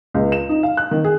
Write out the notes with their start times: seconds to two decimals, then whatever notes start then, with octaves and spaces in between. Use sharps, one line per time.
0.14 C#2
0.32 E7
0.49 D#4
0.63 F5
0.77 F#6
0.91 D#3
1.05 G#4